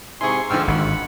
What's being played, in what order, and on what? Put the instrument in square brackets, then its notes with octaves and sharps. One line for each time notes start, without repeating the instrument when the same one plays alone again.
[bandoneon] G#2 C3 G#5 [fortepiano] E4 G#4 [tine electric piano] C6 C#6
[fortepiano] G#2 D3 F3 [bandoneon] G5 E6 F6
[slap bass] G#1 [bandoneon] F#5 B5